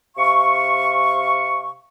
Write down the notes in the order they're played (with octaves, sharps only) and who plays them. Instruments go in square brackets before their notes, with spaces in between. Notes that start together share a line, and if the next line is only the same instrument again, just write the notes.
[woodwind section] C3 F5 C#6